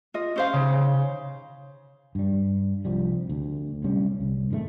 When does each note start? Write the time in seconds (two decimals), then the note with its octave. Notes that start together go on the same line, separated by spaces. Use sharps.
0.14 F4 D#5
0.36 C#4 C5 F5
0.53 C#3
2.15 G2 G3
2.85 C2 F3 G3
3.29 D2
3.84 D1 C3 G3 C#4
4.20 C2
4.51 G#2 D#3 F3 A3